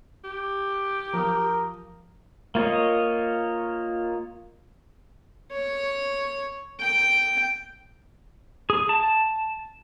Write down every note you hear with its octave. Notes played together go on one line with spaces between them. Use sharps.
G4
F3 A#4 D#6
A#3 F4 C#5 D#5
C#5
G5
G#4
A5